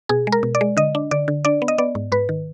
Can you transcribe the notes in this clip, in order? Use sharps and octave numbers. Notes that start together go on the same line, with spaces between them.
B2 G#4
G#3
A#4
B2
D5
G#3
D3 D#5
D4
D3 D5
D3
D4 D5
B3
D#5
B3 D5
G#2
G#2 B4
D#3